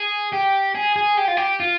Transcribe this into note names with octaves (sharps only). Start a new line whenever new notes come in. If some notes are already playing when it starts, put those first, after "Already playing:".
Already playing: G#4
G4
G#4
G#4
G4
F4
G4
F4